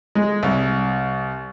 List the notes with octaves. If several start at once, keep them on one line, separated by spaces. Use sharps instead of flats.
G#3
C2